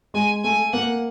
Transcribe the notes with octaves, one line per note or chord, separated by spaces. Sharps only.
G#3 G#5
A3 G#5
A#3 F#5